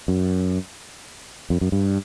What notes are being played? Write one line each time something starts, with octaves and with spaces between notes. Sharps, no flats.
F#2
F2
F#2
G2